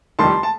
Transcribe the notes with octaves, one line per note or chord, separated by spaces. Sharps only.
F1 F2 D#3 G3 A5 C6
A5